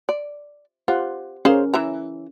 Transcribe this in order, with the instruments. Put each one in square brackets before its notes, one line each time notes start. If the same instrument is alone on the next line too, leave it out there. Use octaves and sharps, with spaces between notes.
[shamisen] D5
[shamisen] F4 [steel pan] G4 C5 F#5
[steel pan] C#4 A#4 [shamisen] G#4 C5 F5
[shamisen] E3 E5 A#5